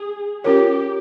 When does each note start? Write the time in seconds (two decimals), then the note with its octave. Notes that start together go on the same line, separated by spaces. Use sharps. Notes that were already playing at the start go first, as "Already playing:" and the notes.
Already playing: G#4
0.44 C#4 F4 G4 A#4 C#5